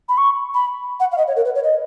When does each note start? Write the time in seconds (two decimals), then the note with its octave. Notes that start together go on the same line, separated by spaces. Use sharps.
0.09 B5
0.18 C#6
0.54 B5
1.00 F#5
1.12 F5
1.18 D#5
1.28 C#5
1.36 A#4
1.45 B4
1.55 C#5
1.64 D#5